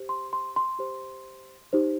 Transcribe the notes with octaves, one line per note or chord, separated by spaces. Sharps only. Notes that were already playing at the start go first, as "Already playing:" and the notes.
Already playing: G4 C5
C6
C6
C6
G4 C5
D#4 G4 C5